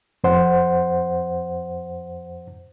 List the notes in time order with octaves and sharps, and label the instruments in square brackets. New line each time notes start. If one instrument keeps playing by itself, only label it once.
[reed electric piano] F2 C5 F#5